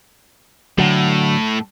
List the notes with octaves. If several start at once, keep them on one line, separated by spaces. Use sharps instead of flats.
A2 D3 F#3